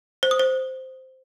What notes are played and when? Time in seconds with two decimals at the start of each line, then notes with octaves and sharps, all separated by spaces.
0.23 C5
0.31 D#6
0.39 C5